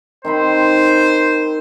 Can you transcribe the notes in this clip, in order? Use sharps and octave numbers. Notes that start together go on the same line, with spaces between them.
D#3 C4 C5 B5